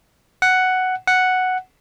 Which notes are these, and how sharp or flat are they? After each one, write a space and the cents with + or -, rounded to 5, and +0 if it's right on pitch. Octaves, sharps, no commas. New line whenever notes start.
F#5 +5
F#5 +0